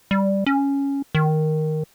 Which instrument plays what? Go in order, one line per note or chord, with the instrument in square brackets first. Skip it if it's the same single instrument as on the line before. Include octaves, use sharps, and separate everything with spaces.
[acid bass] G3
C#4
D#3